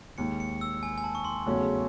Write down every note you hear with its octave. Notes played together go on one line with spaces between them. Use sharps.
D#2 D#3 G#3 C#7
C#7
E6
G#5
G#5
A5
C#6
C6
E2 C#3 F#3 A3 C#4